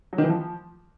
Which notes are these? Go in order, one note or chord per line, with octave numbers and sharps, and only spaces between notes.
F#3
D#3
E3
F3